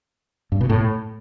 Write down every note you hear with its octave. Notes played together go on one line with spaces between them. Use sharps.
G2
B2
A2